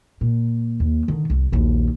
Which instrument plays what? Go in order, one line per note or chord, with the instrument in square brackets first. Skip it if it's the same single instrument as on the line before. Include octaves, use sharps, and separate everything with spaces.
[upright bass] A#2
D#2
D3 D#3
C2 F2
A#1 D#2